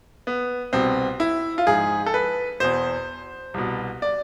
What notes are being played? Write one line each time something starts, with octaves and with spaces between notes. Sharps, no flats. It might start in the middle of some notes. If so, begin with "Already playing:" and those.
B3
C2 B2 C4
E4
F4
G#2 F3 G#4
A4
B4
E2 B2 C5
C2 B2
D5